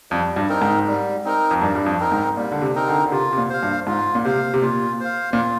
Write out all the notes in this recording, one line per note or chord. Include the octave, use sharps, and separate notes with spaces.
F2 G3
G2
C4 D#4 A#4
G#2
G3
C4 D#4 A#4
F2
G2 G3
G2
F2
C4 D#4 A#4
G#2
A#2 G3
D3
C3
C4 D#4 A#4
D3
D3
C3 F4
C3
A#2
C5 F5
G2
G#2 F4
A#2
C3 C5 F5
C3
A#2 F4
C5 F5
A#2
F4